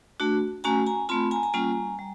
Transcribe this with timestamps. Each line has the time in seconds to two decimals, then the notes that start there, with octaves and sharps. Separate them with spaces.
0.20 A3 D4 F#4
0.64 A3 C#4 F#4 G#5 A#5
0.86 G#5 A#5
1.09 A3 C4 F4 A5 B5
1.31 G#5 A#5
1.43 G#5 A#5
1.53 G3 A#3 C#4 F4 G#5 A#5
1.99 G3